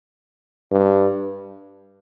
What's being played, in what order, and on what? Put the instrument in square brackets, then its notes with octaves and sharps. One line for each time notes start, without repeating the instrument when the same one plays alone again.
[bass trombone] G2